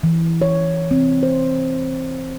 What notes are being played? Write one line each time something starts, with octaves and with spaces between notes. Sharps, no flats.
E3
C#5
C4
C5